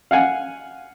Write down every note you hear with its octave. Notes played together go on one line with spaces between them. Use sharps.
F5 F#5 G#5